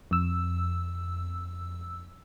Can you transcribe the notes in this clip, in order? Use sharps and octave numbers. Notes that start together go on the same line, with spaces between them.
F2 E6